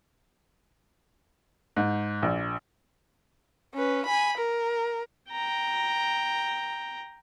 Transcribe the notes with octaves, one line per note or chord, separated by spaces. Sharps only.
G#2
A#1
C#4 B4
G#5 B5
A#4
G5 A#5